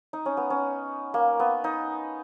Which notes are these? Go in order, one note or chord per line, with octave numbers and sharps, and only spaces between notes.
D#4
C#4
B3
C#4
A#3
B3
D#4